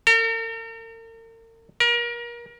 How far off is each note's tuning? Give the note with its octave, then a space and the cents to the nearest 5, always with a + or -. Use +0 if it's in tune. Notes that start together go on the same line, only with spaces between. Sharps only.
A#4 -45
A#4 +30